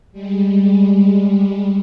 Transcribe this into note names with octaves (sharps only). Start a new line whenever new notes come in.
G3 G#3